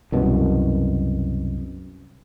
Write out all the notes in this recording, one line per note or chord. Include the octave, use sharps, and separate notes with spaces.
C2 F#2 B2